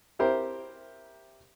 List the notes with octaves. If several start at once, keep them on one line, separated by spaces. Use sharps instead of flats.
C4 E4 G4 A#4 C5